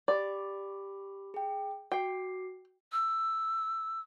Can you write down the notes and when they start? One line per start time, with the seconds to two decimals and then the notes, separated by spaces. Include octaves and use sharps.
0.08 G4 D5 B5 D6
1.34 G#4 G5
1.92 F#4 G5 D6 C7
2.92 E6